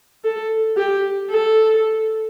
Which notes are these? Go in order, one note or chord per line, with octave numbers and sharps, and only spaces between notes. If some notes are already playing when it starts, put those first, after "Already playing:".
A4
G4
A4